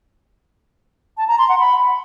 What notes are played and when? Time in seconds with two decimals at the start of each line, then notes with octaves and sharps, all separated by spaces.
1.17 A5
1.28 A#5
1.38 C6
1.49 F#5
1.59 B5